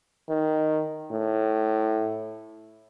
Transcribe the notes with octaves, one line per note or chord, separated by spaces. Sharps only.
D#3
A2